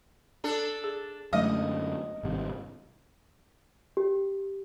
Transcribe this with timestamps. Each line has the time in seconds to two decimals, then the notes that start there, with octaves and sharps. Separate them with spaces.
0.44 D4 A4
0.84 G#4
1.33 F#2 D3 F#3 G#3 A3 D#5
2.23 G#1 G2 C3
3.97 G4